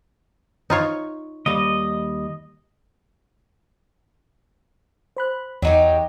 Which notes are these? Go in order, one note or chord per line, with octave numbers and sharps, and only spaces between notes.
D#4 F4 C#5
D#2 G3 D#5
C5 B5 F#6
E2 F#3 D#4 G4